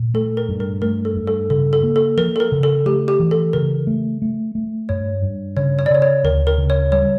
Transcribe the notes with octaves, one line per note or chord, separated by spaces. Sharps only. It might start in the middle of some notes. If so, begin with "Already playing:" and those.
Already playing: A#2
A3 A4
A#4
G2
A#4
A3 A#4
A4
G2
A4
C#3 A4
A4
A#3
A4
F3 A#4
A4
A#4
C#3
A4
A3 G4
G4
E3
A4
C#3 A#4
A3
A3
A3
G2 C#5
G2
C#3 C#5
C#5
D5
C#3 C#5
C#5
D2 A#4
A#4
C#3
C#5
G3 C#5